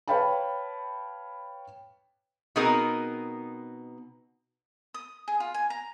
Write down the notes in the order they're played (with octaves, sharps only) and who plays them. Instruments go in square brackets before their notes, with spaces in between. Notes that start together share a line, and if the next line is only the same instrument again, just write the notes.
[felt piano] B4 C#5 F5 G5 A5 B5
[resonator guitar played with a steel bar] B2 B3 C4 D#4 G#4 A#4
[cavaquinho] D#6
G#4
F4
G#5
A#5